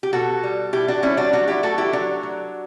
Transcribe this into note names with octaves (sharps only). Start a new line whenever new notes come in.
G4
B2 F#4 A4
G3
B2 E4 G4
D4 F#4
G3 C#4 E4
D4 F#4
F#3 D4 F#4
E4 G4
A3 F#4 A4
E4 G4
F#3 D4 F#4
F#3